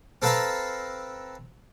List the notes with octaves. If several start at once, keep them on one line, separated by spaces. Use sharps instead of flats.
C4 A4 B4 F5 A5 A#5